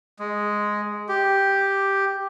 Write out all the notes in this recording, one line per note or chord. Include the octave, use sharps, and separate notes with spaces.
G#3
G4